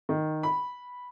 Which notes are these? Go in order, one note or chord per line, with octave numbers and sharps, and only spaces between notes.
D#3
B5